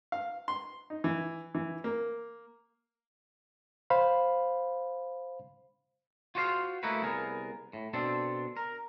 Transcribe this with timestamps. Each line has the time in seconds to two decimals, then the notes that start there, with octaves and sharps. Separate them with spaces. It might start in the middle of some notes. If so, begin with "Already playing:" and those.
0.12 F5
0.48 C6
0.90 D#4
1.04 E3
1.55 E3
1.84 A#3
3.90 C5 F5 B5
6.35 F4 F#4 C5 D#5 F5
6.83 A3 A#3 D#4 E4 F#4 B4
7.02 C2 B3 G#4 A#4
7.73 A2
7.93 B2 C4 D4 A4
8.57 A#4